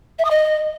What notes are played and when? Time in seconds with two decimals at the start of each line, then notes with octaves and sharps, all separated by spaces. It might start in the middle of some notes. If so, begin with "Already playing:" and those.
0.19 E5
0.25 D#6
0.31 D#5